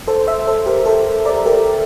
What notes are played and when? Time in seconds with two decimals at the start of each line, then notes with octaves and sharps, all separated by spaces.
0.08 A4 C5
0.27 C5 E5
0.47 A4 C5
0.66 G4 A#4
0.86 A4 C5
1.25 A#4 D5
1.46 G4 A#4